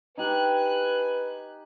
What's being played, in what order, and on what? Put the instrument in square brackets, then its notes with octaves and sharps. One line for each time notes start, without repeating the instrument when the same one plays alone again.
[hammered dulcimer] D#4 G4 [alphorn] B4 [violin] G#5 F#6